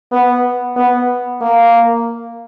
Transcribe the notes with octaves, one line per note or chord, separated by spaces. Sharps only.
B3
B3
A#3